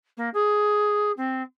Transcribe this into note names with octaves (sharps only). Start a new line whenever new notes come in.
A#3
G#4
C4